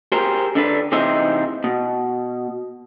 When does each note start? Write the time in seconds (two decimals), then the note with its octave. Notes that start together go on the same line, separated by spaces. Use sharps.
0.12 G4 G#4 A#4 C5
0.55 D3 D4 B4
0.92 C3 E3 D#4 G#4 C5 E5
1.64 B2